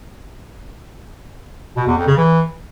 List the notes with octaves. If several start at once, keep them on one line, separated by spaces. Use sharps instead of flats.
B2
E2
F2
C#3
E3